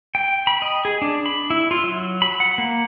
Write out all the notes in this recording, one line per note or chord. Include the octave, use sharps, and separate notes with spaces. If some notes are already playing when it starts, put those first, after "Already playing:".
G5
B5
D#5
G#4
D4
B5
E4
F4
F#3
B5
F#5
A#3